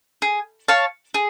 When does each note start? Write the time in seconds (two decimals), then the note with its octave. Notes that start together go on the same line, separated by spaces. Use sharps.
0.22 G#4
0.68 C#5 F5 A5
1.14 G#4